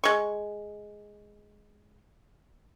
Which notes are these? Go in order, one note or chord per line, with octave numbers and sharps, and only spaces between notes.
G#3 C#6